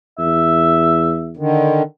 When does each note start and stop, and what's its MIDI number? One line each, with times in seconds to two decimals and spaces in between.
0.19 1.41 40
0.19 1.28 76
1.37 1.83 50
1.37 1.83 51